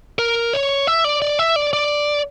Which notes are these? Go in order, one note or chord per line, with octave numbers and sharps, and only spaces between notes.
A#4
C#5
E5
D5
D5
E5
D5
D5